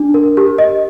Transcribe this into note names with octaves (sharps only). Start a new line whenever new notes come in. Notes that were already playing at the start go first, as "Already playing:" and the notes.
Already playing: D4
A#4
G4
D#5